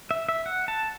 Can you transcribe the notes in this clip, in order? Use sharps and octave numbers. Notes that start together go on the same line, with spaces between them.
E5
E5
F#5
A5